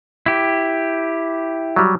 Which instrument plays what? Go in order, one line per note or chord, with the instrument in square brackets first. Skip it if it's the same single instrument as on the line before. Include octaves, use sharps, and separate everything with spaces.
[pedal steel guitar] E4 G4
[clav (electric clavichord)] F#3 G3